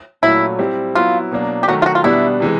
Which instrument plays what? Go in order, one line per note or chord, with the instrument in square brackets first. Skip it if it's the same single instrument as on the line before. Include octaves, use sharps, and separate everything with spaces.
[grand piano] A#2 F#3 A3 C#4 [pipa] E4
[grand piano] G3 C4 E4 G4
[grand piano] F#3 B3 E4 [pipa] F4
[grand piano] B2 F#3 A#3 D4
[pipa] G4
[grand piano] D#3 F#3 A3 [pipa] F#4
[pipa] F4
F#4
F4
[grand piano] B2 G3 B3 D4 [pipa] E4
[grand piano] C3 E3 G#3